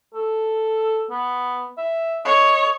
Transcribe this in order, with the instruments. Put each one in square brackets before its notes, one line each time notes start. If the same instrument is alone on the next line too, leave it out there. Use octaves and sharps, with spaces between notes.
[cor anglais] A4
B3
E5
[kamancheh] C#5 [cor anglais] D#5